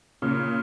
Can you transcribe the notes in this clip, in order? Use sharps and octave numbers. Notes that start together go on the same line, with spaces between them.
A#2 C#3